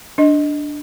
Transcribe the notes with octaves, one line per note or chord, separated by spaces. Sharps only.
D4 D#5